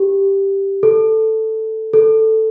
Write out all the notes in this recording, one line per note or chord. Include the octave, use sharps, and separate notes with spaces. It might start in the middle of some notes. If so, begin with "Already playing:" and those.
Already playing: G4
A4
A4